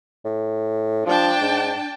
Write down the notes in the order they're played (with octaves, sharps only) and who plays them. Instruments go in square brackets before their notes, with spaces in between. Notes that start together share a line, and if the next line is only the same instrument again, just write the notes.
[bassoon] A2
[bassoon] F3 [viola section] D4 G5 A5
[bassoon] G#2